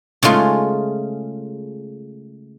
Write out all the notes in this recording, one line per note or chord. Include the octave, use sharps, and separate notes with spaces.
C#3 G#3 A3 F4